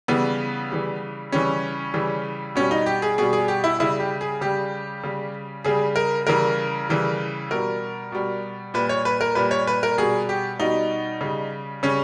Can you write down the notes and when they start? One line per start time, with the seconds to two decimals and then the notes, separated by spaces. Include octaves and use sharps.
0.08 C#3 E3 G3 B3
0.71 C#3 E3 G3
1.32 C#3 E3 G3 C#4
1.94 C#3 E3 G3
2.55 B2 G3 C#4
2.71 D#4
2.86 G4
3.02 G#4
3.18 B2 G3 G#4
3.33 G#4
3.48 G4
3.64 E4
3.80 C#3 G3 E4
4.00 G4
4.21 G#4
4.41 C#3 G3 G4
5.04 C#3 G3
5.64 C#3 G3 G#4
5.96 A#4
6.27 C#3 E3 G3 A#4
6.89 C#3 E3 G3
7.51 B2 G3 A#4
8.12 B2 G3
8.74 A#2 G3 B4
8.89 C#5
9.05 B4
9.21 A#4
9.35 A#2 G3 B4
9.51 C#5
9.67 B4
9.83 A#4
9.98 B2 G3 G#4
10.29 G4
10.59 B2 G3 D#4
11.21 C#3 G3
11.83 C#3 G3 C#4